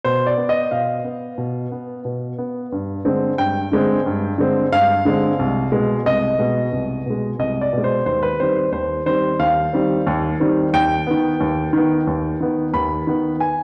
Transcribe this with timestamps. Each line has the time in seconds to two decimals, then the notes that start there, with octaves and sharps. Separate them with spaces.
0.04 B2 C5
0.27 D5
0.37 B3
0.49 D#5
0.71 B2 F5
1.04 B3
1.38 B2
1.72 B3
2.05 B2
2.38 B3
2.72 G2
3.05 D3 G#3 C4
3.38 G2 G5
3.72 D3 G#3 C4
4.06 G2
4.38 D3 G#3 C4
4.72 G2 F5
5.05 D3 G#3 C4
5.39 C2
5.72 B2 G#3
6.06 C2 D#5
6.39 B2 G#3
6.72 C2
7.06 B2 G#3
7.39 C2 D#5
7.61 D5
7.73 B2 G#3
7.84 C5
8.06 D#2 C5
8.23 B4
8.40 D#3 G3 C4 C5
8.56 C5
8.72 D#2 C5
9.06 D#3 G3 C4 C5
9.39 D#2 F5
9.73 D#3 G3 C4
10.07 D#2
10.40 D#3 G3 C4
10.73 D#2 G5
11.07 D#3 B3
11.40 D#2
11.73 D#3 B3
12.07 D#2
12.40 D#3 B3
12.73 D#2 B5
13.07 D#3 B3
13.40 G#5